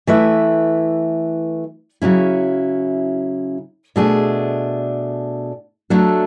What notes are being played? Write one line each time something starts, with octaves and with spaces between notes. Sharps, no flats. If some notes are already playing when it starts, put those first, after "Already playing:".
E3 A3 E4 B4 E5
C#3 F#3 C#4 E4
B2 A3 D4 G#4
F#3 A3 D4 A4